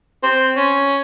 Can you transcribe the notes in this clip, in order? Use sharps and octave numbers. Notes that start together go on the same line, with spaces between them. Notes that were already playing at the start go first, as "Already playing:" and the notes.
C4
C#4